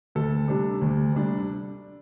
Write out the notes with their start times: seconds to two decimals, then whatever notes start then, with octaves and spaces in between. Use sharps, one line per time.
0.15 D2 A4
0.48 C3 G3 D4
0.81 D2
1.13 C3 G3 D4